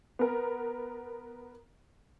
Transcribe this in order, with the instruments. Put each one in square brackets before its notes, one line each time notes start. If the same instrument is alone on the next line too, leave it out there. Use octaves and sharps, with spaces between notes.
[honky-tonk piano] B3 A#4